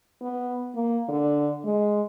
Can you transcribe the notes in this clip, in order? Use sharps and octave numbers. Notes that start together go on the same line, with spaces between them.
B3
A#3
D3
G#3